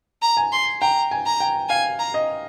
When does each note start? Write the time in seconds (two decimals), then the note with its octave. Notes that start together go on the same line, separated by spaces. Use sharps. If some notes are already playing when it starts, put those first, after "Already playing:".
0.22 A#5
0.37 G#5
0.52 C6
0.81 G5 A#5
1.11 G#5
1.26 A#5
1.40 G5
1.69 F5 G#5
1.99 A#5
2.14 D#5